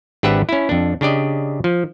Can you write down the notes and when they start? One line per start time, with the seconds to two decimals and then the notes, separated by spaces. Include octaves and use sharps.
0.23 G#1 D4 G4 B4 E5 F#5
0.49 C#4 E4
0.69 F2 D4
1.01 C#3 D4 G4 D5 D#5
1.64 F3